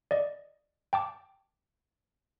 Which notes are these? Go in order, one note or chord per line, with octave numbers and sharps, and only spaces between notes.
D5 D#5
G5 A5 D6